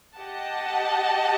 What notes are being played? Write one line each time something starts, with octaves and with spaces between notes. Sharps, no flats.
G4 D#5 F#5 A5